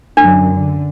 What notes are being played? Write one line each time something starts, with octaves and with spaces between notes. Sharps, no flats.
F#2 D3 D4
D3